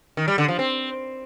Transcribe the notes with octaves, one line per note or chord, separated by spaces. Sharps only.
D#3
G3
D3
F3
C4